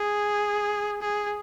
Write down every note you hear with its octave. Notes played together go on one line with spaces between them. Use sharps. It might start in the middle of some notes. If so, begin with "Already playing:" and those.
Already playing: G#4
G#4